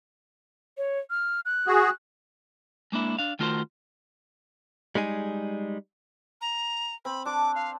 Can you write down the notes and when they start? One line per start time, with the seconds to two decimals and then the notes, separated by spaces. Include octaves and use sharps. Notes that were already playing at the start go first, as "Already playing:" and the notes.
0.78 C#5
1.10 F6
1.45 F#6
1.67 F#4 G#4
2.92 G#3 A#3 D4 E4
3.19 D4 F5
3.39 D#3 A3 F4 F#4 A#4 C5
4.95 G3 G#3 D#4 G#4
6.41 A#5
7.05 C4 B5
7.25 D4 A5 C6 D6
7.55 F5